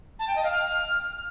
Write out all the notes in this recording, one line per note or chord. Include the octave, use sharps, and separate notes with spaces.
A5
G5
D#5
F5
F6